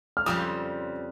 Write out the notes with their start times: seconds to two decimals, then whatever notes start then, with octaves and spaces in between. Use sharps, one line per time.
0.17 F6
0.26 F2 C#3 G3 C4 F4 D#6